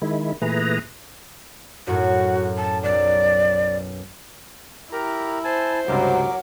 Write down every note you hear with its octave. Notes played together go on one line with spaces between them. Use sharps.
D#3 G#3 E4
A#2 E3 A3 G#4 B4 A#5
F#2 A2 F#4
A5
B1 D5
E4 G4 A#4 A#5
C5 G#5 A5
C#2 G2 C3 F#3 A#4 D6